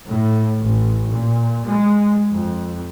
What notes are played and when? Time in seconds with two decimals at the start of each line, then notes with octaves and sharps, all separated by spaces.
0.10 A2
0.63 A1
1.12 A#2
1.65 G#3
2.33 F2